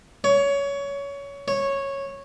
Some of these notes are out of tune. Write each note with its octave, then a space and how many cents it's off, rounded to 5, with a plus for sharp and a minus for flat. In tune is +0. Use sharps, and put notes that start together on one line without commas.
C#5 +20
C#5 -10